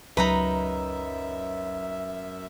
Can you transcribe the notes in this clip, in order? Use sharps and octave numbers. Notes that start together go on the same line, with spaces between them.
C#2 F#2 F#3 D#4 B4 E5 A#5 B5